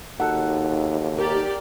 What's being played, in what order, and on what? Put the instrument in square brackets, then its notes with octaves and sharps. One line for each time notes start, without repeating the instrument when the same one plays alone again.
[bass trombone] D#2 [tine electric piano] D#4 F#4 A4 [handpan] F#5
[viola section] G4 D5 [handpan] A#4